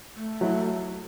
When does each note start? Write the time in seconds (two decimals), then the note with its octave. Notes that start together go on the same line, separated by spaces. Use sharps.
0.16 A3
0.41 F#3 E4